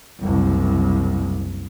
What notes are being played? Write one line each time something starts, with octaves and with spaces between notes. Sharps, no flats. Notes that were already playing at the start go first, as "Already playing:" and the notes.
F#1 C2